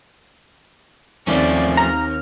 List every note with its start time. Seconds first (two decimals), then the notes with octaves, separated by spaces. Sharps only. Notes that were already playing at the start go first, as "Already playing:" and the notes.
1.27 D#2 F3 A3 C4 C#4 D5
1.77 A#5 F6